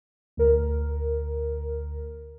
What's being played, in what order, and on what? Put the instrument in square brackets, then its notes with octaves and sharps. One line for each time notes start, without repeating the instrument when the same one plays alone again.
[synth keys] D2 A#4